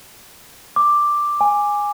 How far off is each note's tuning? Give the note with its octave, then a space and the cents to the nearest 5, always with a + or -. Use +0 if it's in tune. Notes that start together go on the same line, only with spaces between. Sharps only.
D6 +5
G#5 -10